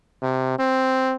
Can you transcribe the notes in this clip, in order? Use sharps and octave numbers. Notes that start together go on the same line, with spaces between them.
C3
C4